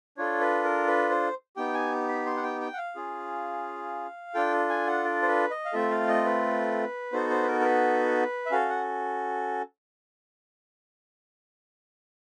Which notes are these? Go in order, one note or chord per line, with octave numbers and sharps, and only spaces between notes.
D4 F4 A4 C#5
B4
A#4
B4
C5
B3 D#4 G4 G5
G#5
B5
C6
F#5
G5
G5
F#5
F5
C#4 F4 G#4
D4 F4 A4 G5
G#5
F#5
D5
C5
B4
D#5
F5
A3 C4 F4 A4 E5
F5
D#5
B4
B3 D#4 F#4 A4 C5
C5
B4
A#4
A#4
B4
E5
C#4 F#4 A4 F5
F#5